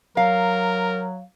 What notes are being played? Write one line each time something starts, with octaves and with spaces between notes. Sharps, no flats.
F#3 A#4 F5